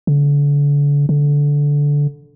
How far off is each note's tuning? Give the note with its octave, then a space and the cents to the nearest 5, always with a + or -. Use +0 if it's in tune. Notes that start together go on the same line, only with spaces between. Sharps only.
D3 -35
D3 -15